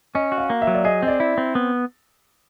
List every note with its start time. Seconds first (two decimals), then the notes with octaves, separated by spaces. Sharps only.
0.15 C#4 D#5
0.32 F#4
0.38 F5
0.50 A#3
0.62 E5
0.67 F#3
0.74 D5
0.84 G#4 D#5
1.03 C4 D#5
1.08 D5
1.20 E4
1.38 C4
1.55 B3